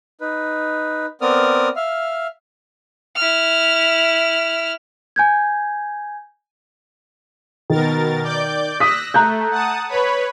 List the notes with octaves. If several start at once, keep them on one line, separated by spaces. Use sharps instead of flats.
D#4 B4
B3 C4 A#4 D5 D#6 F6
E5 F5 F6
E4 F6
G#5 G6 G#6
B2 D#3 A#4 A6
D5 D6 G6
D#6 E6 F#6 A#6 B6
A3 A#5 F#6 G6
F#5 A5 D#6
B4 C#5 B5